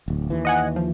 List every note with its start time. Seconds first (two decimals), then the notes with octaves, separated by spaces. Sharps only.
0.08 D1 D2
0.30 D#2 E3
0.45 D#5 F#5 G#5
0.76 F3